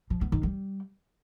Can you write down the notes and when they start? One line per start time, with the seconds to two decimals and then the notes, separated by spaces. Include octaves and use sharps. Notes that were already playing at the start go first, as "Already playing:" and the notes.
0.10 F3
0.21 B3
0.32 D#3
0.43 G3